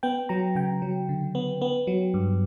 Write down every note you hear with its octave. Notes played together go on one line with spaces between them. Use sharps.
B3 G5
F#3 A#5
C#3 G5
F#3
D3
B3
B3
F#3
G2